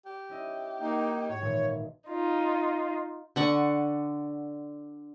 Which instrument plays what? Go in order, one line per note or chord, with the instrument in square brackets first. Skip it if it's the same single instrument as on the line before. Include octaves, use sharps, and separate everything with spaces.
[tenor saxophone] G4
[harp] C#4 E4 D#5
[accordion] A#3 D#4
[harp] G#2 F#4 G#6 [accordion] C#5
[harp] G#1 A#2 E3
[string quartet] D#4 F4
[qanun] D3 F#5 C#6